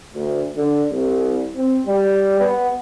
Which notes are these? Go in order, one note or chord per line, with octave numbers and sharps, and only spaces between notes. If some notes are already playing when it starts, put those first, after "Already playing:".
D2
D3
C2
C4
G3
B3